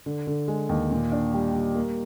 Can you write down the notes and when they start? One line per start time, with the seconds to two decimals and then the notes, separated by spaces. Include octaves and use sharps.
0.06 D3
0.27 D3
0.48 G#3
0.69 D#2
0.91 A#2
1.12 D4
1.34 G3
1.54 G3
1.75 A#3